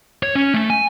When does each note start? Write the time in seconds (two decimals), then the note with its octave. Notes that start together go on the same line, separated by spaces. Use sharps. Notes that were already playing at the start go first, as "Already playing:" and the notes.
0.23 C#5
0.35 C#4
0.54 A3
0.70 G#5